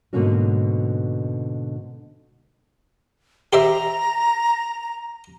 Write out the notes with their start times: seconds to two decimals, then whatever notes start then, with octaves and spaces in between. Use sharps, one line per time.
0.13 G#2 B2 D3 A#3 C#4 F#4
3.53 G4 C5 E5 A#5